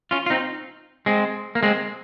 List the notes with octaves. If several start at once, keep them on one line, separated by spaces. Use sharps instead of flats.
C#4 F4
F4
C4 D#4
G#3 C4
A#3
G#3 C4